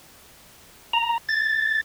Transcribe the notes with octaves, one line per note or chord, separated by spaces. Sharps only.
A#5
A6